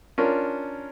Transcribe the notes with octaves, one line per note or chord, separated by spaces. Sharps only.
C#4 D4 F4 A#4